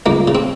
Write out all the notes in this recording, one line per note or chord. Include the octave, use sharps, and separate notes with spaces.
C#2 A#3
C#3
C4